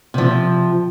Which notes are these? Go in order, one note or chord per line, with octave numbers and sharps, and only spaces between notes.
C3 F3